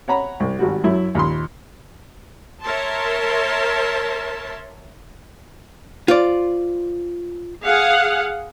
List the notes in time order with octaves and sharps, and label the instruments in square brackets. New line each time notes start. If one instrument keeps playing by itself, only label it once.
[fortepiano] C#5 F#5 A#5 B5
C2
G#1 G3 F#4
F#2 F#3 E4
D#2 A#2 B5 C6
[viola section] A#4 C#5 E5 A5 C6
[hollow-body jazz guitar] F4 C5 D5
[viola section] G#4 F5 F#5